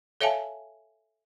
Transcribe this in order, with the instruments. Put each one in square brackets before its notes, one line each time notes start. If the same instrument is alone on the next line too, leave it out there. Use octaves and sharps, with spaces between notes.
[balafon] A4 C#5 E5 F5 G#5 A5